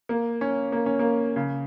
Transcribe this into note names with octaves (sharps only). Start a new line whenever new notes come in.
A#3
C#4
A#3
C#4
A#3
C#3